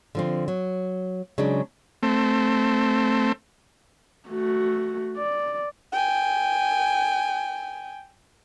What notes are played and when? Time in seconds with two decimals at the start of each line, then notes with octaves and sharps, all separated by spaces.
0.15 D3 F3 C4
0.48 F#3
1.38 C#3 F#3 G#3 D4
2.03 A3 C4
4.29 A3 F#4
5.17 D5
5.92 G5 G#5